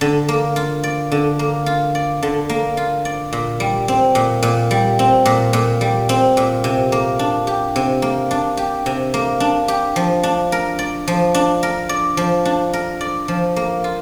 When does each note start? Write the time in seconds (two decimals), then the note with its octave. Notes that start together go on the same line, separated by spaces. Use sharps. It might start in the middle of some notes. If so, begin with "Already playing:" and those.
0.01 D3
0.29 A#3
0.56 F4
0.83 D5
1.12 D3
1.39 A#3
1.66 F4
1.95 D5
2.22 D3
2.49 A#3
2.77 F4
3.05 D5
3.33 A#2
3.60 G3
3.88 C4
4.15 A#2
4.43 A#2
4.71 G3
4.99 C4
5.26 A#2
5.53 A#2
5.81 G3
6.09 C4
6.37 A#2
6.64 C3
6.92 A#3
7.19 D4
7.47 G4
7.76 C3
8.02 A#3
8.31 D4
8.57 G4
8.86 C3
9.14 A#3
9.40 D4
9.68 G4
9.96 F3
10.23 D4
10.52 A#4
10.79 D5
11.08 F3
11.34 D4
11.63 A#4
11.89 D5
12.17 F3
12.45 D4
12.73 A#4
13.01 D5
13.28 F3
13.56 A#3
13.84 F4